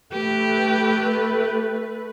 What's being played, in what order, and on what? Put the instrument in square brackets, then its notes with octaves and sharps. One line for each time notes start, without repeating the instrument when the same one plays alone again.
[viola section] A3 B4 [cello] G4